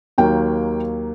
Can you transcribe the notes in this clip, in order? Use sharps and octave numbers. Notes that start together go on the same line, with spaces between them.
D#2 D#3 F#3 A#3 G5